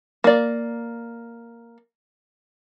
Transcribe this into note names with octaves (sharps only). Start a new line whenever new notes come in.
A#3 D5